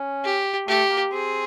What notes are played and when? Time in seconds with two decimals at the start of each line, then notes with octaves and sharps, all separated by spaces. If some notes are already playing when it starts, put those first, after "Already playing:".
Already playing: C#4
0.24 G4
0.68 A3 G4
0.90 A#3
1.12 C4 G#4